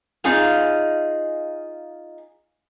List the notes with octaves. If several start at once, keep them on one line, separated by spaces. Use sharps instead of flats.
D#4 F4 G#4 F5